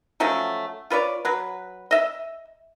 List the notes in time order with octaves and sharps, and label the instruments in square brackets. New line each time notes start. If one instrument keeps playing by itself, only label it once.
[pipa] F3 F#3 A3 C#4
F4 B4 C#5 D5
F#3 B4
D#5 E5